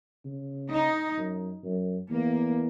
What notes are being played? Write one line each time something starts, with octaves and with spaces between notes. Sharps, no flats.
C#3
D#4
F#2
F#2
E2 A#3